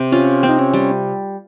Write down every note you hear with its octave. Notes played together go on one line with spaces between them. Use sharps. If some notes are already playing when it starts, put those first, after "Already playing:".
Already playing: C3
C#4 F4
C4
D#4
C#4
G3